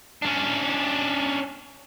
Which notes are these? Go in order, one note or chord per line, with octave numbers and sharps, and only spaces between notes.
C#4 D4